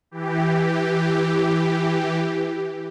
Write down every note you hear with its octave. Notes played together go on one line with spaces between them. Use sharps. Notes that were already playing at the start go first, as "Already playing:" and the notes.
E3 G4